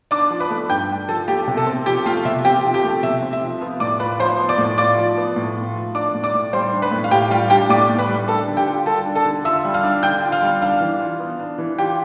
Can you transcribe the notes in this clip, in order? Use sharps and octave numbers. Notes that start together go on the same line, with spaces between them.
D4 D5 D6
F3
B4 B5
A3
G2 G5 G6
D4
F3 A4 A5
A3 G4 G5
C3
A4 A5
C4
F3 G4 G5
A3 F4 F5
C3 E5
C4 G4 G5
F3
G4 G5
A3
C3 E5
C4
E5
F3
B3 F4 F5
A2 D5 D6
F4 B4 B5
F3 C5 C6
B3
D5 D6
A2
F4 D5 D6
F3
B3
A2
F4
F3
D4 D5 D6
A2
D5 D6
A2
G3 C5 C6
D4
B4 B5
A2
F5
A2 G4 G5
G3 F4 F5
D4 G4 G5
A2 D5 D6
A2
B4 B5
G3
D4 A4 A5
D3
G4 G5
F4
G3 A4 A5
D4
A4 A5
D3
F4 E5 E6
G3
F5 F6
D4
D3 G5 G6
F4
F5 F6
G3
D4 F5 F6
E3
F4
B3
D4
E3
F4 G4 G5